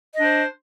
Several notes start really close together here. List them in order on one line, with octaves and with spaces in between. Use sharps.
D#5 D4 C5